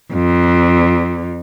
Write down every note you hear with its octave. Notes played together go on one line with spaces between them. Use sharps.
F2